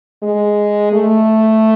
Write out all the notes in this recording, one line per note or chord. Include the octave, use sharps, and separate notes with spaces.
G#3
A3